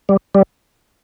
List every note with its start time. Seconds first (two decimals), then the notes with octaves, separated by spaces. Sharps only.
0.09 G3
0.35 G3